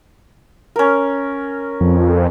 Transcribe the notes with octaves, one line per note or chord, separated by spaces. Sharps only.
C#4 A#4
F2